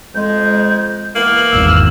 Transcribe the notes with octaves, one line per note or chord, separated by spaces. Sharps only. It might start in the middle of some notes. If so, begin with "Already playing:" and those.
F2 G#3 G6
E3 A#3 B3 F#7
G#1 E2 E6